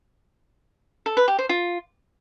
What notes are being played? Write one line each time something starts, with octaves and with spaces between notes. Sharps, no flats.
A4
B4
G4
C5
F4